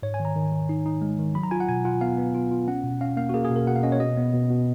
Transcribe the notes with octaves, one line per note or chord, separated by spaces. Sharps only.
G#2 C#5
G#5
D#3
A#5
D#3
D#3
D#4
D#4
G#3
D#3
F#3 B5
A#5
F4 G#5
F#5
B2 G#5
F4 F#5
B3 F5
B3
F4
F4
C#4 F#5
B2
C#4 F5
A#3 F5
F#4
A#3 G#4
G#4
B2
A#4
B2 F#5
F5
C#4 D#5
C#5
B2 D#5
B3
B2
B2